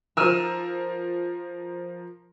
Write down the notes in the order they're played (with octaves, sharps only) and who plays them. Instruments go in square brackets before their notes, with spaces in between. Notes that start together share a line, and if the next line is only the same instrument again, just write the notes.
[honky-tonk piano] F3 A#4 [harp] E6 F6 D#7